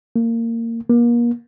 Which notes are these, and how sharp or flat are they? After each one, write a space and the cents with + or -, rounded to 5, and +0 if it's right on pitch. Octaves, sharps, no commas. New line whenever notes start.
A#3 -20
A#3 +35